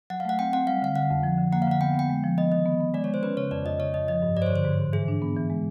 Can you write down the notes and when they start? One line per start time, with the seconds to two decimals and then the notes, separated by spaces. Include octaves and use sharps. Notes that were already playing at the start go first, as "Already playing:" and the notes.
0.10 F#3 F#5
0.20 F5
0.25 A3 F#5
0.39 C4 G5
0.53 C4 F#5
0.67 G3 F5
0.82 D3 F5
0.95 D3 F#5
1.10 F2
1.23 F3
1.38 D3
1.52 A#3 F#5
1.62 F5
1.67 D3 F#5
1.81 B3 G5
1.94 B3 G5
2.10 G#3
2.24 F3
2.38 B3 D#5
2.52 D#3 D#5
2.66 B3
2.81 B3
2.94 G#3 D5
3.04 C#5
3.08 G#3
3.14 C5
3.23 C#4 B4
3.37 C#3 C#5
3.51 F2 D5
3.65 F2 D#5
3.79 C#3 C#5
3.94 F2 D#5
4.08 F3 D#5
4.22 G2
4.36 G2 D5
4.42 C5
4.46 C#5
4.50 D3
4.56 C5
4.65 G#2
4.79 G#2
4.93 E3 G#4
5.08 D4
5.22 B3
5.36 E3
5.50 G#3